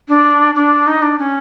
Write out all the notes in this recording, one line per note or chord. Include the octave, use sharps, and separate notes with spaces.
D4
D4
D#4
D4
C#4